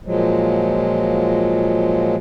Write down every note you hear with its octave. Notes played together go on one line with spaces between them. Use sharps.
A#2 F3 F#3 G#3